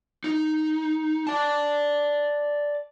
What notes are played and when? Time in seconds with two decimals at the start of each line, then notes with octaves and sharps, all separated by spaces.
0.24 D#4
1.27 D5 A5